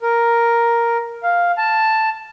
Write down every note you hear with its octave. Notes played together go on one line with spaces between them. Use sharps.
A#4
F5
A5